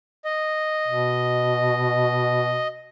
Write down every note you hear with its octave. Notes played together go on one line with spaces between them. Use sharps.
D#5
B2